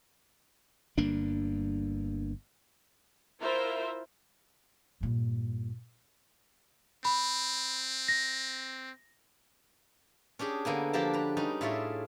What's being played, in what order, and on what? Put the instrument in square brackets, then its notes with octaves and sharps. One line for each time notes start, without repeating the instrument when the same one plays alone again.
[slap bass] G1 G2 A#3 D4
[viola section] E4 F4 A#4 C5 E5
[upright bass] G2 A#2
[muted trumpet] C4 [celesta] B5
[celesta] A#6
[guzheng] C#4 D4 G4 G#4
D3 A#3 B3 G#5
F3 A#3 D4 G4 A5 A#5
B4 A#5
G3 C#4 D#4
A2 F4 G#4 C#5 D5 E5